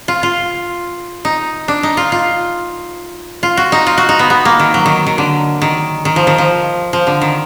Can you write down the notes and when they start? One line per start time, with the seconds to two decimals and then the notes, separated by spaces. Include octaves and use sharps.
0.08 F4
0.23 F4
1.25 D#4
1.68 D4
1.83 D#4
1.97 F4
2.12 F4
3.43 F4
3.57 F#4
3.72 D#4
3.87 F4
3.98 F#4
4.09 D#4
4.19 B3
4.30 B3
4.45 A#3
4.59 D#3
4.74 F#3
4.86 D#3
5.07 D#3
5.18 D3
5.62 D#3
6.05 D#3
6.16 F3
6.27 D#3
6.38 F3
6.93 F3
7.07 D3
7.21 D#3